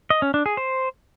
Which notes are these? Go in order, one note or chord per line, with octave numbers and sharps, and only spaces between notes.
D#5
C#4
D4
G#4
C5